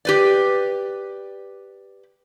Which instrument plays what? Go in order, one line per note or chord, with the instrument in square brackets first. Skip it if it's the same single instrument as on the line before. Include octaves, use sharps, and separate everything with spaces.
[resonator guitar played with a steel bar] G4 B4 D5